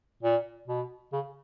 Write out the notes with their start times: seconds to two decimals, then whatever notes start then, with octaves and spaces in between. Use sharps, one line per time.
0.23 A#2
0.68 B2
1.13 C#3